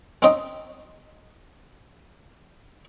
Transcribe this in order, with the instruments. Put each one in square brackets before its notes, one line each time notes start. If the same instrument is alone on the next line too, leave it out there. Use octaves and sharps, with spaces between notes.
[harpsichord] C4 C#4 D#4 C5 D#5 G5